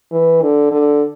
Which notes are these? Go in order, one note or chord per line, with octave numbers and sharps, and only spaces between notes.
E3
D3
D3